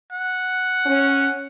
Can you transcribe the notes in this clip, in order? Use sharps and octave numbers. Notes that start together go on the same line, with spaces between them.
F#5
C#4